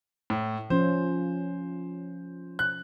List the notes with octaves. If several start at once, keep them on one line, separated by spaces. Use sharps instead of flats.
A2
F3 C#4 F4 C5
F#6